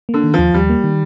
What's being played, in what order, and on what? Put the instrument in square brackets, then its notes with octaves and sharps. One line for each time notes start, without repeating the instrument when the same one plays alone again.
[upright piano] D3 [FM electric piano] A#3
[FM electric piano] D#3
[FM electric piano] D#2 [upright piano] F3
[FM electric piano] D#2 [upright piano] G3
[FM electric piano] A#3
D#3